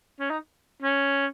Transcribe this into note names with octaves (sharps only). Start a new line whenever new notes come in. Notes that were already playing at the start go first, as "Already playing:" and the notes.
C#4
D#4
C#4